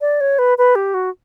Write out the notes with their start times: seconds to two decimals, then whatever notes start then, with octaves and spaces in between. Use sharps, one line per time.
0.01 D5
0.20 C#5
0.39 B4
0.58 B4
0.75 G4
0.94 F#4